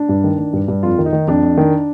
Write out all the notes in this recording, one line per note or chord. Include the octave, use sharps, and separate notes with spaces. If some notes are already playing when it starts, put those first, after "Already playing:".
Already playing: D4
G2
D#3
D#3
G2
G2
F2 F4
D#3
D#4
D#3
F2 D4
F2
D#3